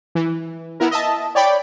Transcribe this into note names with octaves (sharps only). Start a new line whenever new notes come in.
E3
B3 E4 A#4
D#5 E5 A5
C#5 D5 G5 B5